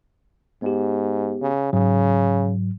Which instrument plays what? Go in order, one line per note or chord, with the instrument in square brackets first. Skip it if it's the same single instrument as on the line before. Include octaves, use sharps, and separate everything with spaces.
[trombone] G#2 [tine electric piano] B3 G4
[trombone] C#3
[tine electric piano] G#2 F#3 [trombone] C#3